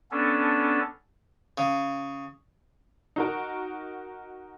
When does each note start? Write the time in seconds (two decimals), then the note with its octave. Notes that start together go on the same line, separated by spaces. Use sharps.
0.11 B3 C#4 D4 A4
1.58 C#3
3.16 D#4 F#4 A#4